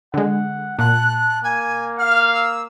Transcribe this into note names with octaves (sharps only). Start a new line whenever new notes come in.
D3 G#3 F#5
A#2 A5 F#6
A#3 G#5
F5 F6
E6